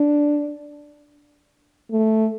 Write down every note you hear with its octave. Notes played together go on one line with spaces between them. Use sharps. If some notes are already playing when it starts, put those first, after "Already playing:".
Already playing: D4
A3